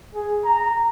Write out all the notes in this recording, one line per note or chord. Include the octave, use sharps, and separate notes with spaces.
G#4
A#5